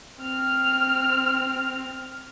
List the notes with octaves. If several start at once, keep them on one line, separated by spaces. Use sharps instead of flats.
C4 F6